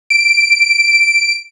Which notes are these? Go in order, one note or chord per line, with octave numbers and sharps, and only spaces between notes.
D7